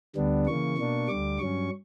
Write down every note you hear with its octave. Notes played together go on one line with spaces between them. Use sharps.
D2 D3 G3 B3 D4
C#3 E3 A#3 C#6
B2 A#3 D4
D2 D3 G3 D6
G2 F#3 C#4 C#6